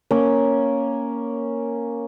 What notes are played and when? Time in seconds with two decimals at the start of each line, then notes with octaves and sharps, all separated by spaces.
0.11 A#3 C#4